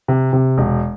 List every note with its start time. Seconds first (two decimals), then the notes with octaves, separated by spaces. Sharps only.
0.08 C3
0.33 C3
0.58 E1